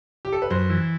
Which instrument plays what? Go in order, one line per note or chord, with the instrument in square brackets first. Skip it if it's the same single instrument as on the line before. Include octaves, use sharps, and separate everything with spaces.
[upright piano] G4
A4
B4
[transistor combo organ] F#2 [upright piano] C5
[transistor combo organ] E3